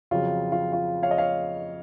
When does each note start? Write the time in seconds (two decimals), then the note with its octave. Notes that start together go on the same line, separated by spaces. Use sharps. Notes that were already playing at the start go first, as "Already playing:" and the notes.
0.11 F2 C#3 F#3 F4
0.52 F4
0.73 F4
1.03 C#5 F5
1.11 D#5
1.18 C#5 F5